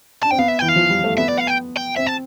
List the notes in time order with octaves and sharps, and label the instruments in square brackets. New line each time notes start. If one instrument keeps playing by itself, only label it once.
[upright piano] D4 [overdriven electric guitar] A5
[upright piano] C4 [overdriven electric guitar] G5
[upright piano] B3 [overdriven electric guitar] F5
[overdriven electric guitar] E5
[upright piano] E3 [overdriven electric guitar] G5
[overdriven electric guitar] F5
[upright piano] F3
G3
A3
[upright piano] B3 [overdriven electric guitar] E5
[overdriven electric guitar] D5
F5
G5
G5
[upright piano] C4 [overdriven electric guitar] E5
[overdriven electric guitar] A5